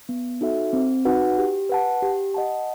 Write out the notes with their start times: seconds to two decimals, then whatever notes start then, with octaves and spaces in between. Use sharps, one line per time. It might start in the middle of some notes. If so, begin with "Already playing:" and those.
0.09 B3
0.41 D#4 F#4 A4 E5
0.73 C4
1.05 D#4 F#4 B4 F#5
1.38 G4
1.69 B4 F#5 A5
2.02 G4
2.34 D#5 F#5 A5